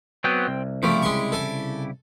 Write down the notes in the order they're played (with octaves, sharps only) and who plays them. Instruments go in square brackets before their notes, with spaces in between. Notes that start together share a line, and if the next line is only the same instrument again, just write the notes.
[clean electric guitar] F#3 B3 [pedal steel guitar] C4 G5
[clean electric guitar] C2
[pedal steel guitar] C#3 E4 G4 [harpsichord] F3 A3
[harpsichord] G#3 C6 C#6
A4 G#5